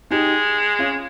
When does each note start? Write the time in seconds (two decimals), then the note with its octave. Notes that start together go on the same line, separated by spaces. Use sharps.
0.11 G#3 D#4 G4
0.79 C#4 F4